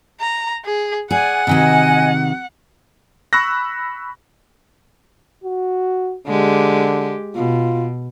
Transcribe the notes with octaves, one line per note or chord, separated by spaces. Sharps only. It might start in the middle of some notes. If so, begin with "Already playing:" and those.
A#5
G#4
G#4 D5 F#5 G#5
C3 D#3 F#4 D#5 G#5
B5 C#6 E6 F#6 A#6
F#4
D3 G#3 G4
B2 F4